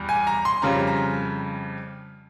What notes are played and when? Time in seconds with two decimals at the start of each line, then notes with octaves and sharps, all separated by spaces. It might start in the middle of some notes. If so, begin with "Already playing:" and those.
Already playing: E2 G3
0.09 G#5
0.27 A#5
0.45 C6
0.62 F2 C#3 G3 C#4 A#5
0.87 A#5